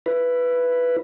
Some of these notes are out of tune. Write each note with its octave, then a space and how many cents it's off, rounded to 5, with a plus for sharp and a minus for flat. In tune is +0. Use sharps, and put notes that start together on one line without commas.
E4 +25 B4 +0